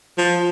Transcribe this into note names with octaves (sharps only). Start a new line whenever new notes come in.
F3